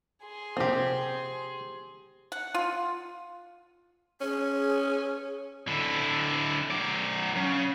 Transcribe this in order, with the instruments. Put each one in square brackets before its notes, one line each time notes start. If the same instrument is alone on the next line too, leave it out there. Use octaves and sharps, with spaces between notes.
[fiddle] G#4 C6
[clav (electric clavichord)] C3 F3 A#3 [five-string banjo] C4 G4
[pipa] F#5
F4
[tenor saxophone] C#4 [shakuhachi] G#4
[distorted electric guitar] D3 E4
F#3 D5
C#3